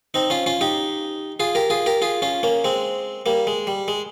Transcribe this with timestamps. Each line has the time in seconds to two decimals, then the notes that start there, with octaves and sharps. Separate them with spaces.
0.14 C4 D#4
0.30 C#4 F4
0.46 C#4 F4
0.61 D#4 G4
1.40 F4 G#4
1.55 G4 A#4
1.70 F4 G#4
1.86 G4 A#4
2.02 F4 G#4
2.22 C#4 F4
2.43 A#3 C#4
2.64 G#3 C4
3.26 G3 A#3
3.47 G#3
3.67 G3
3.88 G#3